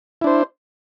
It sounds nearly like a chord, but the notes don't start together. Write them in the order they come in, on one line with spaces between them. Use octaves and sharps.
E4 D4 C5